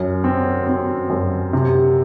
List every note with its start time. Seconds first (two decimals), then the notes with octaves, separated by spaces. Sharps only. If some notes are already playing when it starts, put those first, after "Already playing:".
Already playing: F#2
0.24 C4
0.67 C4
1.10 F#2
1.53 C3